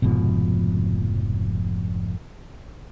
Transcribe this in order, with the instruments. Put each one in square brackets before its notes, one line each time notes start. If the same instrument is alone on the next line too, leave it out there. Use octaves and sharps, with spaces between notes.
[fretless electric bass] F1 G#2 B2 F3